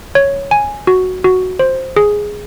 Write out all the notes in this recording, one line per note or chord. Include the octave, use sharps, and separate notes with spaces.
C#5
G#5
F#4
F#4
C5
G#4